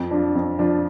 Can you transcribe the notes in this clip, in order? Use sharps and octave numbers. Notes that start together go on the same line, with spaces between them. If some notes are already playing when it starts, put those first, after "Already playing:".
Already playing: F2
F3 D4 F4
F2
F3 D4 F4